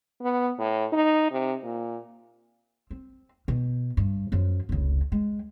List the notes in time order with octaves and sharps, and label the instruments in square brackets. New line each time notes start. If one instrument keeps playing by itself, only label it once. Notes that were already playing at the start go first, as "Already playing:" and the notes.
[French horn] B3
A2
D#4
C3
A#2
[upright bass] C4
B2
G2
F#2 F3
F1 C#2
G#3